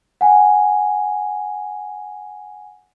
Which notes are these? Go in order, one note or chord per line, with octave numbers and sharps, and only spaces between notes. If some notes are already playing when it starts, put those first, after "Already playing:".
F#5 G#5